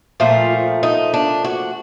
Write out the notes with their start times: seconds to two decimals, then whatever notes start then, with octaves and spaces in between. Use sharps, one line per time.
0.20 A#2 F3 A3 F4
0.83 D#4
1.14 D4
1.45 F#4